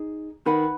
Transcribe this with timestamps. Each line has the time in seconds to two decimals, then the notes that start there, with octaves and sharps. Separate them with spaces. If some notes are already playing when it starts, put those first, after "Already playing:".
Already playing: D#4 G#4
0.45 D#3 D#4 B4 F#5 B5